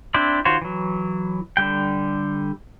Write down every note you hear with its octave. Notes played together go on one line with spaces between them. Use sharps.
C4 D4 E4 C5 D5
D#3 F4 F#4 C5 C#5
E3 F#3
D3 G3 G5